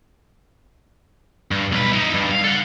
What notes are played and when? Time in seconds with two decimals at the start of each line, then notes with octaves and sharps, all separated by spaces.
1.51 G2
1.72 B1 B4
1.93 D#4 E4
2.14 G2
2.31 F5
2.44 A4 F#5